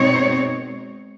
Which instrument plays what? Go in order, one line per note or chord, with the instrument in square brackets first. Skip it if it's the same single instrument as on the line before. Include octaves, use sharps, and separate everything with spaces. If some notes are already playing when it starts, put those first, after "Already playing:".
Already playing: [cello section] B2 G#3 C4 D#4 C#5